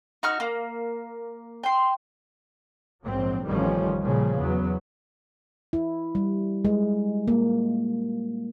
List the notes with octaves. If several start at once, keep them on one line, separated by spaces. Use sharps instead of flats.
D#4 F#4 C#6 F6
A#3
G5 C6
A#1 G#2 F#3 C4
A1 F2 D#3 F3 G3 C#4
A#2 C#3 F3 G3
E2 F#3 B3
E4
G3
G#3
A#3